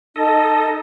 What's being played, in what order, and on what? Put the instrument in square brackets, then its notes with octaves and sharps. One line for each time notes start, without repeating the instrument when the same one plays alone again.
[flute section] D#4 A5 [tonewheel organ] A4 D#5